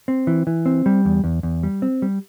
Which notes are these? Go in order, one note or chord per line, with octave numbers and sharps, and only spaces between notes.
C4
E3
E3
C4
G3
E2
E2
E2
G3
C4
G3